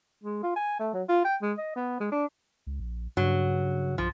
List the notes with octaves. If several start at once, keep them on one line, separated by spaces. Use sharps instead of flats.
G#3
F4
G#5
A3
F#3
F4
G5
G#3
D#5
B3
G#3
D4
C#2
A#1
G2 C#3 F#3
B1 F3